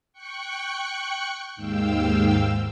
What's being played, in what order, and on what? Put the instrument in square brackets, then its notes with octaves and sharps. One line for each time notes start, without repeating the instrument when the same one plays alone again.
[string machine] G5 C#6 F#6 C#7
D#2 G#2 F5 G5 E6